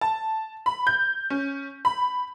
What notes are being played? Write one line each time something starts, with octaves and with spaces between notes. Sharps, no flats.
A5
B5
G6
C#4
B5